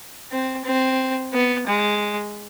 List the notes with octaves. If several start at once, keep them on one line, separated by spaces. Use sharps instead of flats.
C4
C4
B3
G#3